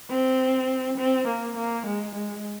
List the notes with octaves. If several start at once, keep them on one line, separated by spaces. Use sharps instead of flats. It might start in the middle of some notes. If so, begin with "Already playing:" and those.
C4
C4
A#3
A#3
G#3
G#3